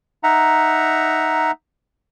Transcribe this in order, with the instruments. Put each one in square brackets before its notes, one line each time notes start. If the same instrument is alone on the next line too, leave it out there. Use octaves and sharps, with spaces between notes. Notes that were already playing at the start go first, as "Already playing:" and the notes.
[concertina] D#4 E5 F#5 A#5